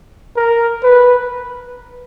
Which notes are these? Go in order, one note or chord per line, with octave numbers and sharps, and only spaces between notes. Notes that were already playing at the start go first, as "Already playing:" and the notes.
A#4
B4